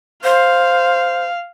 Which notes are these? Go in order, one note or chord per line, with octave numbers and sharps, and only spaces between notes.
C5 F5